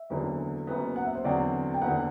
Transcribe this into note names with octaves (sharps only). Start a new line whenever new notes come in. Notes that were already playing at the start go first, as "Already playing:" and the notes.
Already playing: E5
F#1 E2 D3 F#3
F#1 F#2 F#3 B3
F#5
E5
C5
E2 D3 F#3 C4 F#4 D5
G5
F#1 E2 D3 F#5